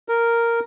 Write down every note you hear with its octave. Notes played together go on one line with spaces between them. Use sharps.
A#4